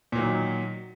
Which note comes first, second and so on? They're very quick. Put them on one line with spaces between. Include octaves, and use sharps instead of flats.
A#2 F#3 D#3